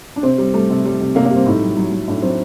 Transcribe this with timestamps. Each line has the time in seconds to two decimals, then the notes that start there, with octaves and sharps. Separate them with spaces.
0.16 D4
0.23 C3 C4
0.38 G3
0.54 G3 A3
0.70 C3
0.85 G3
1.00 C3
1.15 C3 A#3
1.25 A#3
1.31 G3 C4
1.46 A2 D#4
1.62 F#3
1.77 F#3
1.92 F#3
2.08 A2 D4
2.22 F#3 C4